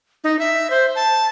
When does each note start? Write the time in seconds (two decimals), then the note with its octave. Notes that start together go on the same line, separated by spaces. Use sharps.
0.24 D#4
0.39 E5
0.70 C5
0.96 A5